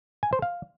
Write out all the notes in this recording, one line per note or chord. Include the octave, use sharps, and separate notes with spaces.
G#5
C5
F5